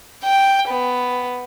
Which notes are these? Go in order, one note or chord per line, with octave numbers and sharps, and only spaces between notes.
G5
B3